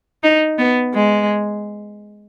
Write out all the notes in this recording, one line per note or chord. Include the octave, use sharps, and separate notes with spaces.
D#4
B3
G#3